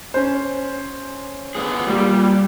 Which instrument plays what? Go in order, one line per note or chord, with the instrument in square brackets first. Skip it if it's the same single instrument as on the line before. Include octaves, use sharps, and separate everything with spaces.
[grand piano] C#4 C5
[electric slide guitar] D3 B3 G#4
[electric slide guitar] A#2 [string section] G3